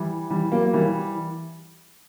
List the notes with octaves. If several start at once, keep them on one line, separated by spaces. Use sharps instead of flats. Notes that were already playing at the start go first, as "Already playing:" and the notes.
Already playing: E3 G3
E3 G3
F#3 A#3
E3 G3